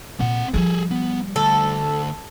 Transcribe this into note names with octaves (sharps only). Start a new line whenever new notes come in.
A#2 C4 F#5
F3 G3 G#4 A4
B3
D2 A4